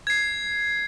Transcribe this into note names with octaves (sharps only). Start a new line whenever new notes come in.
G#6 C7